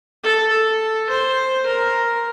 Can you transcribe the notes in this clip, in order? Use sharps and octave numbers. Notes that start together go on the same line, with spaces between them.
A4
A4
C5
A#4